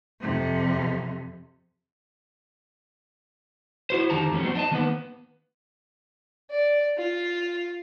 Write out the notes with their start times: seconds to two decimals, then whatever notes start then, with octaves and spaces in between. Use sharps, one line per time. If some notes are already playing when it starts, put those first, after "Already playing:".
0.21 F2 C3
3.90 E4 F#4 C5
4.10 F2 D3 D#3 G4 A5 A#5
4.31 F2 A3 C#4
4.43 F#3 B3 C4
4.55 D4 D#5 A5
4.71 D#3 A#3 B3 B4
6.51 D5
6.98 F4